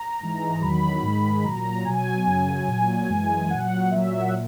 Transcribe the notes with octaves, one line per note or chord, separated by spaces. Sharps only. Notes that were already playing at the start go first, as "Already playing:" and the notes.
Already playing: A#5
G#2 E3 G#3
E2 D#3 F#3 B5
G#2 D#3 G#3
A#2 F#3 A#5
B2 F#3 G#5
F#2 C#3 F#3
A#2 F#3
F#2 E3 G#3
A#2 F#3 F#5
A#2 F#3 E5
F#5
A#2